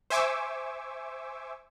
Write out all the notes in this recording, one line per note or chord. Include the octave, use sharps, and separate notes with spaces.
C5 E5 G#5 C#6 D6 E6